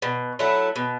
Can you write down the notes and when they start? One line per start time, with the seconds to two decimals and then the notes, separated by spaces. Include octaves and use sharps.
0.02 B2
0.39 F#3 A3 E4
0.76 B2